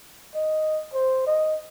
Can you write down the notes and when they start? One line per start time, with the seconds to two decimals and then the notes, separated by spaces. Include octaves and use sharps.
0.35 D#5
0.94 C5
1.27 D#5